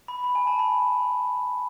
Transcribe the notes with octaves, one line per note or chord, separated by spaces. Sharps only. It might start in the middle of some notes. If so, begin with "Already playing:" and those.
B5
B5
G#5
A5
B5